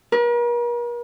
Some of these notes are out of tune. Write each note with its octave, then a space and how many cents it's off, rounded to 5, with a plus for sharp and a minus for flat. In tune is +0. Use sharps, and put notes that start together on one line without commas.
A#4 +45